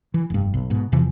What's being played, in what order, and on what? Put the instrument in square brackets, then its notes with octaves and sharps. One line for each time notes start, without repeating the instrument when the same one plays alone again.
[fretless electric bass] E3
F1 G2
B1
G#2 B2
E2 C3 E3 F3